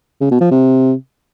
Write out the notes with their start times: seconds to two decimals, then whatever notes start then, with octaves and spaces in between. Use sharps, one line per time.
0.21 C#3
0.31 B2
0.41 F3
0.51 C3